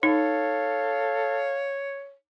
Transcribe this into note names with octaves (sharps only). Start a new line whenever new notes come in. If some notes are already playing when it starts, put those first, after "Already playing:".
D#4 A4 C#5 F5